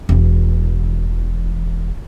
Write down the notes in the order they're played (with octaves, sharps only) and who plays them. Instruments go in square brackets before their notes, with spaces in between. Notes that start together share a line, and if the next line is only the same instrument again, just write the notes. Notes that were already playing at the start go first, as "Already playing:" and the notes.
[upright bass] E1 E3